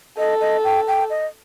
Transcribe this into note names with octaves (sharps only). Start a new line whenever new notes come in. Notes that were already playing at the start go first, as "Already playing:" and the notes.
A4 D#5
D#5
G5
G5
D#5